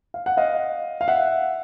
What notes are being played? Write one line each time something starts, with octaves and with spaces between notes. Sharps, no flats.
F5
F#5
D#5 F5
F5
E5 F#5